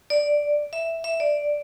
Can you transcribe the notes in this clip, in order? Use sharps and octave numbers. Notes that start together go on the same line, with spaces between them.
D5
E5
E5
D5